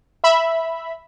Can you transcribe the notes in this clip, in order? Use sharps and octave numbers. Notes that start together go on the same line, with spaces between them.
E5 B5